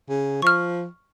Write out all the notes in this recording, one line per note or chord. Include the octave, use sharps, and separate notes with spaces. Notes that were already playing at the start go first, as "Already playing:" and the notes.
C#3
F3 C#6 F6